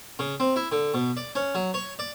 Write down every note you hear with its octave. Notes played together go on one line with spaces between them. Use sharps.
C#3
C4
E4
D3
B2
D5
C#4
F#3
C#5
D5